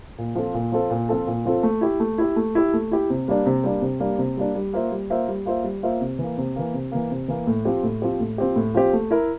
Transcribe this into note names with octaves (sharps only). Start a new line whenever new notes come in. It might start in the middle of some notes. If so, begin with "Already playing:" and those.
A#2
F3 C4 F4 A4
A#2
F3 C4 F4 A4
A#2
F3 C4 F4 A4
A#2
F3 C4 F4 A4
A3
E4 G4
A3
E4 G4
A3
E4 G4
A3
E4 G4
C3
G3 A#3 D4
C3
G3 A#3 D4
C3
G3 A#3 D4
C3
G3 A#3 D4
G3
A#3 F4 C5 E5
G3
A#3 F4 C5 E5
G3
A#3 F4 C5 E5
G3
A#3 F4 C5 E5
C3
E3
A#3
C3
E3 A#3
C3
E3 A#3
C3
E3 A#3
A2
F3 C4 G4
A2
F3 C4 G4
A2
F3 C4 G4
A2
F3 C4 G4
A3
E4 A#4 E5